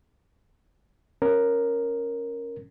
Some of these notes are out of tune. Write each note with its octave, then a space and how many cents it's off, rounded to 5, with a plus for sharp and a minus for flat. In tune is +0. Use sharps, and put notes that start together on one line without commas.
C#4 -5 A#4 +0